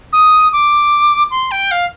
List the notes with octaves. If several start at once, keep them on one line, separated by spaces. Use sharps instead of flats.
D#6
D6
C6
G5
F5